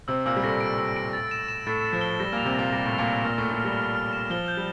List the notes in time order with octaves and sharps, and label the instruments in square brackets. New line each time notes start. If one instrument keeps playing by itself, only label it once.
[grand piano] C3 C4 [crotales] E6
[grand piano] A#2 A#3 [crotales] E6
[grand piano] G3
[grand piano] A2 A3 [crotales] A#6
[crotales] D7
E6
D7
A6
E7
E7
[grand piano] A2 A3 [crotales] A6
[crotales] A6
[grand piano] F3
[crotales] G7
[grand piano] G3 [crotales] A#6
[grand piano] A#2 A#3 [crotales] F7
[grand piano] C3 C4
[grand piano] A#2 A#3 [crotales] A#6
[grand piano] G3 [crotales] A#6
[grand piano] A2 A3 [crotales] F7
[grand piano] A#2 A#3
[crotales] F7
[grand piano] A#2 A#3 [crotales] F6
[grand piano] A2 A3
[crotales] F6
[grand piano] A2 A3
[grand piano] G3 [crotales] F6
[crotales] F6
F6
E7
[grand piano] F3 [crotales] G7
[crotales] G6
[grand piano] G3